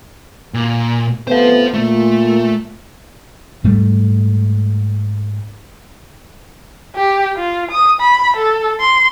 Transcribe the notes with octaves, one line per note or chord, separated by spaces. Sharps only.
A#2
C3 A3 B3 C5 F5
A#2 A3
G#2 G3 A3
G4
F4
D#6
B5
A4
C6